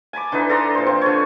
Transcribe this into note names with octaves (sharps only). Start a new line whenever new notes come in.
G#5 A5 B5 D6
D3 E3 D#4 B4
A4 D5 A#5 C6
A#2 C5
F3 C4
D3 A4 C#5